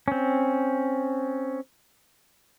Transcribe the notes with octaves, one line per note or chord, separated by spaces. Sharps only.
C4 C#4